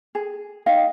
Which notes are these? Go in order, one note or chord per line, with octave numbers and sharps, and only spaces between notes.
G#4
D#4 D#5 F5 G5